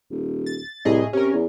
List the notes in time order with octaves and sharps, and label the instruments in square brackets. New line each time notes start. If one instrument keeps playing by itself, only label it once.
[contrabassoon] D#1
[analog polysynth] A6
[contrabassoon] C2 [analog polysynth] A2 G#4 D#5
[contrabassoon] C3 [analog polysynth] C#4 A#4
[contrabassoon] E2